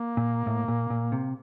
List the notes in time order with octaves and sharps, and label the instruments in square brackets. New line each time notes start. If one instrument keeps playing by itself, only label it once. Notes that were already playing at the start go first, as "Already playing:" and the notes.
Already playing: [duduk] A#3
[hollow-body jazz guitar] A#2
A2
A#2
A#2
C3